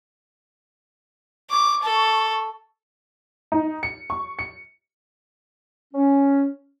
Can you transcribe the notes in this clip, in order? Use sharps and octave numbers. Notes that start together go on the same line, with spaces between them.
C#6 D6
A4
D#4
C#7
C#6
C#7
C#4